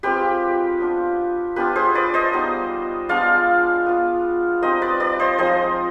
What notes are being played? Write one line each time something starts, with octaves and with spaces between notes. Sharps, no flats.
G#3 C4 F4 G4 B4
B3 D4 F4
B3 D4 F4 G4 B4
G#4 C5
B4 D5
C5 D#5
G3 B3 D#4
G#3 B3 D4 F4 D5 F5
B3 F4
G3 C4 D#4 C5 D#5
B4 D5
B4 D5
C5 D#5
F3 G#3 C4 D#4 C5 D#5